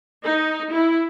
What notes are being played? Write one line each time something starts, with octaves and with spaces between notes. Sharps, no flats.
D#4
E4